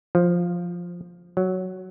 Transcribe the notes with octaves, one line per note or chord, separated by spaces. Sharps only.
F3
F#3